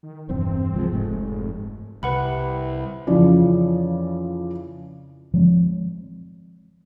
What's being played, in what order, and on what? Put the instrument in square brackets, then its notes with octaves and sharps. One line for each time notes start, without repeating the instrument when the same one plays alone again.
[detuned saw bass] D#3
[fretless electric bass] E1 E2 G2 [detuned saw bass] C4
[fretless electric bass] C2 F3 G#3
[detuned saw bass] F1 [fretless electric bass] G#2 G#3 A3
[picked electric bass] C2 [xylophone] B4 F#5 B5
[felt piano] F2 C#3 E3 F3 C#4 D5
[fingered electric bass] F3 G#3 C4